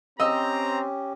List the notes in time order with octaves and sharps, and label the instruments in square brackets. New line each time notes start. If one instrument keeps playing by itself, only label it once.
[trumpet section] C4 [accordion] C#4 G4 [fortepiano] D#5 E6 [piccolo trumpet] A#5